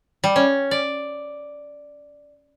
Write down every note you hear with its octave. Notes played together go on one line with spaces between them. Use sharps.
G3
C#4
D5